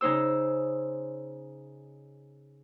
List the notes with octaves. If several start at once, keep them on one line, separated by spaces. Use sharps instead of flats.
C#3 D#4 C5 E6